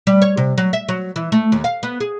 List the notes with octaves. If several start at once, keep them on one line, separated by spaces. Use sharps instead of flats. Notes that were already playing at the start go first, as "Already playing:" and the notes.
G3
C#5
C3
F#3
E5
F#3
E3
A3
D#2
F5
B3
G#4